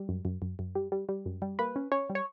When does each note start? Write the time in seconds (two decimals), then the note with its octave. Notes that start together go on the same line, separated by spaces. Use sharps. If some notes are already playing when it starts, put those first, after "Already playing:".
Already playing: G3
0.09 F#2
0.25 F#2
0.42 F#2
0.59 F#2
0.75 G3
0.92 G3
1.09 G3
1.26 F#2
1.42 G3
1.59 A#3 B4
1.76 C#4
1.92 C#4 C#5
2.10 G3
2.15 C#5